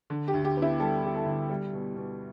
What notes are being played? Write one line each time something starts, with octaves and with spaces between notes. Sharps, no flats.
D3
G4
D2
G4
B3
E4
G3 A4
D3 G4
A4
D2
G3
B2
B2